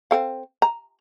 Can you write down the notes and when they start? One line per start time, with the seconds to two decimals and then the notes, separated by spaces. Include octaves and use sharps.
0.11 C4 A4 F5
0.62 A#5